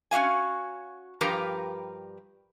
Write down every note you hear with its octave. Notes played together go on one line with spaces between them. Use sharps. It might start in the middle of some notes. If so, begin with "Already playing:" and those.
C#4 F#4 G4 F5 G#5
G2 F3 G4 A#4 B4 A#5